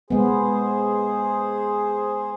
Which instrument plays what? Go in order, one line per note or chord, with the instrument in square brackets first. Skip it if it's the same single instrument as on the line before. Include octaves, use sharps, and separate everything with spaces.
[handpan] G#3 B3 [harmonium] G#4 C5